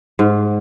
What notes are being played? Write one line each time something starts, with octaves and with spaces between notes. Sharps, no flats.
G#2